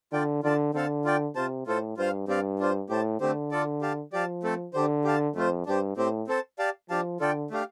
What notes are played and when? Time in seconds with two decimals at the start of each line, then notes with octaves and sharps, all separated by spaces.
0.13 D3 F4 D5 G5
0.43 D3 F4 D5 A5
0.74 D3 C4 A4 F5 A5
1.05 F4 D5 G5
1.35 C3 F4 C5 A5
1.66 A2 F4 A4 C5
1.97 G2 F4 C5 F5
2.28 G2 C4 G4 D5 F5
2.59 D4 F4 C5
2.89 A2 G4 C5 A5
3.20 D3 A3 C4 G4 C5
3.51 D4 F4 A4 D5
3.81 G4 F5 A5
4.13 F3 G4 D5 F5 A5
4.43 A3 C4 A4
4.74 D3 D4 G4 C5
5.04 G4 F5 A5
5.35 F2 A3 F4 C5
5.66 G2 D4 G4 C5
5.96 A2 C4 G4 C5
6.28 C4 A4 C5 A5
6.59 G4 D5 F5 A5
6.90 F3 D4 G4 F5 A5
7.20 D3 F4 A4 D5 G5
7.51 A3 D4 G4 F5